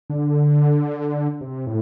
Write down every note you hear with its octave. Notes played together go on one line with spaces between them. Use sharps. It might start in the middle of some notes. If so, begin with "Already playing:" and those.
D3
C3
A2